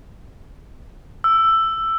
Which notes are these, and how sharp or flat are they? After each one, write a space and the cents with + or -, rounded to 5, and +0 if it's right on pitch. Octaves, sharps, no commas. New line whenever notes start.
E6 +10